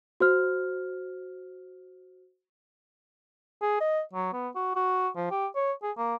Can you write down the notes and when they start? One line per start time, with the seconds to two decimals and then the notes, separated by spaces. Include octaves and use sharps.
0.20 F#4 C5 F6
3.62 G#4
3.80 D#5
4.13 F#3
4.33 B3
4.55 F#4
4.76 F#4
5.16 F3
5.31 G4
5.56 C#5
5.83 G#4
5.97 A#3